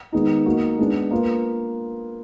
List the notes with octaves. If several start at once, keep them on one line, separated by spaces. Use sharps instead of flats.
D#3 G#3 B3 D#4
A#3 D#4 F#4
G#3 B3 D4
A#3 F4 B4